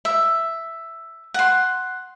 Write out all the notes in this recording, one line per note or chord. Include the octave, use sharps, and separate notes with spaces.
E5
F#5 C6